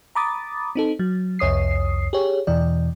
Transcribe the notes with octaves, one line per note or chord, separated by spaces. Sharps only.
A#5 B5 D6 D#6 A6
C4 D#4 A4
F#3
C2 F2 C#5 D#6 C7
G4 G#4 C#5
E2 B2 E3 D5